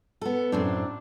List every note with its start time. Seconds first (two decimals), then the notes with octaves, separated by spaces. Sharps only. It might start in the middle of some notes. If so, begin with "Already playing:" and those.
0.21 B3 A4
0.52 F#2 A2 C4 D4